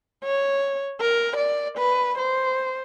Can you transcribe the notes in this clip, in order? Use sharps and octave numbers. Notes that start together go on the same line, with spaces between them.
C#5
A#4
D5
B4
C5